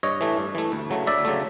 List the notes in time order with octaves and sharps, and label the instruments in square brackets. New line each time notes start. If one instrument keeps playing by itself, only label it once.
[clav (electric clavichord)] G2 C#5 D#5
E3 A3
G2
E3 A3
D2
C#3 F#3 A3
D2 D5 E5
C#3 F#3 A3